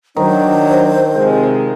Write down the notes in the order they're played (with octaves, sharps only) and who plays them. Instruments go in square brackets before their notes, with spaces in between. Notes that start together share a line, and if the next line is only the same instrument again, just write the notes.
[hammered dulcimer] D#3 [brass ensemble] F#3 D4 [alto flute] C5
[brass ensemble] C3 F3 G#3